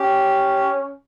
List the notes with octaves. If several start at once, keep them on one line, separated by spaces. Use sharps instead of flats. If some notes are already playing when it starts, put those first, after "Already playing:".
Already playing: C#4 G4